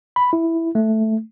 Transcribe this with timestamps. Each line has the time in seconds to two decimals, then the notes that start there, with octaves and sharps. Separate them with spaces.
0.16 B5
0.33 E4
0.75 A3